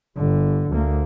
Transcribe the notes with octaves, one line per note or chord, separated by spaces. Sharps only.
G1 D3
D2 A#3